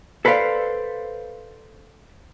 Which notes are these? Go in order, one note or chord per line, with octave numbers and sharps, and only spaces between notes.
A4 B4 C5 D5 F5